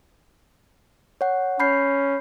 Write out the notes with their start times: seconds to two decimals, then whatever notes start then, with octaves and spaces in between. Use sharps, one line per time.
1.21 C#5 F#5
1.60 C#4 B5 G6 C7